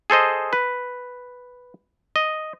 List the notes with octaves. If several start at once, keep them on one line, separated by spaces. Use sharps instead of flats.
G#4 A4 C5 D#5
B4
D#5